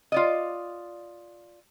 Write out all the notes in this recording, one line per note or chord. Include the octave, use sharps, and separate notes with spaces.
F4 D5 D#5